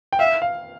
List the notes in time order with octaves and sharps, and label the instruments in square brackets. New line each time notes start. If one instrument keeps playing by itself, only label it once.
[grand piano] G5
[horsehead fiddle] E5 [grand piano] F5
[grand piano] F5